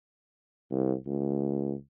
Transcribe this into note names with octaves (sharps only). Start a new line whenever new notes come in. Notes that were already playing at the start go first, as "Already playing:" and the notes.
C2
C#2